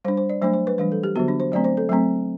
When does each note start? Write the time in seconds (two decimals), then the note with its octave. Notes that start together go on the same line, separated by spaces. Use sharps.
0.05 G3 D4 C5
0.17 C5
0.29 D5
0.42 F#3 A3 D4 C5
0.54 C5
0.67 B4
0.78 E3 G3 D4 B4
0.92 A4
1.03 G4
1.16 D3 F#3 B3 F#4
1.28 D4
1.40 C5
1.52 F#3 A3 C4 D5
1.64 C5
1.77 A4
1.89 F#3 A3 C4